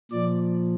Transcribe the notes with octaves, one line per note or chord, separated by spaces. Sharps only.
A#2 F3 D5